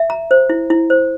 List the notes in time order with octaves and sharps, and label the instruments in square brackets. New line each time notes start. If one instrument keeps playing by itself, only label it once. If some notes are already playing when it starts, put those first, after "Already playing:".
Already playing: [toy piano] E5
A#5
C5
E4
E4
C5